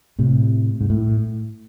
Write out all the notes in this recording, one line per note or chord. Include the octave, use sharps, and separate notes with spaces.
A2 C3
G#2
A2